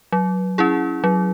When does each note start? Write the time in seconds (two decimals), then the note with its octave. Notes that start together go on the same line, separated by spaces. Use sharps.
0.12 F#3
0.58 C#4 E4 G#4
1.04 F#3